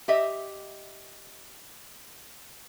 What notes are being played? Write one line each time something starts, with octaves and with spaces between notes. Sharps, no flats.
G4 D#5 E5